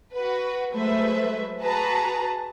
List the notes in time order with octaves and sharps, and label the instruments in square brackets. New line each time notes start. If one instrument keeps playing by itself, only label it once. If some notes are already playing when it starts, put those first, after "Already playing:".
[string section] F#4 B4
F#3 G#3 A3 B4 C5 E5
F#4 G#4 B4 A5 A#5